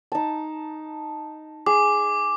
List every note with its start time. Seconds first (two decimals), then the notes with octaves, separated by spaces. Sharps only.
0.12 D#4 A5
1.66 G#4 D6